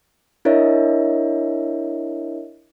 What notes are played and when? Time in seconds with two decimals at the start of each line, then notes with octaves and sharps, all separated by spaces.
0.45 D4 E4 A#4 C#5 D#5 E5